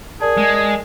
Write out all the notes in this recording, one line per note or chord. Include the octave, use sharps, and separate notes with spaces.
G#4 A#4 D5 A5
G#3